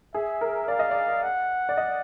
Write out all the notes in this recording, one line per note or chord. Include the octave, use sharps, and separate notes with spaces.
G#4 E5
A#4
D5 F5
D#5
D5
F#5
D5
D#5